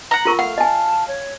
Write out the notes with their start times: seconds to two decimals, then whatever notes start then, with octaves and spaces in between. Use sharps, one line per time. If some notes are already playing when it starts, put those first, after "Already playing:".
0.11 F#5 A#5
0.25 F4 A#4 C#6
0.39 A3 F5 F#5
0.58 D#5 G#5 A5
1.08 C#5